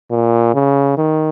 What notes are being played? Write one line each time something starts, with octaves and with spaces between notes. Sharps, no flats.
A#2
C#3
D#3